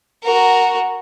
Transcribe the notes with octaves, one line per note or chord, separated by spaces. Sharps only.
F#4 A#4